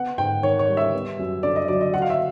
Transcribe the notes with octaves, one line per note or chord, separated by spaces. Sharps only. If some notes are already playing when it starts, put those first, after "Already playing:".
Already playing: B3 F#5
G#2 G5
D#3 C#5
C#5
G3
E5
B3
F#2
D3 D5
D#5
F#3 D5
D#5
F#3 F#5
F5
E5